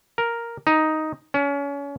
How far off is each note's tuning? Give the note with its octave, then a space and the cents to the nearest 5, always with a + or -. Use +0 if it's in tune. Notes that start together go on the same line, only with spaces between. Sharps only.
A#4 +0
D#4 +5
C#4 +30